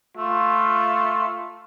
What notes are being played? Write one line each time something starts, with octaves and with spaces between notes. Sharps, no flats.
A3 F4